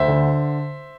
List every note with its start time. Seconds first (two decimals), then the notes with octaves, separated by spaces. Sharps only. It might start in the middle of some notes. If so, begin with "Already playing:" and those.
Already playing: D2 C5 E5
0.08 D3